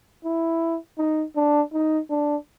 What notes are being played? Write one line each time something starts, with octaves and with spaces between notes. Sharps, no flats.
E4
D#4
D4
D#4
D4